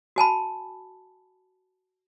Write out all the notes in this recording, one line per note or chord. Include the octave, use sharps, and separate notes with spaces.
F#4 G#5 A5 B5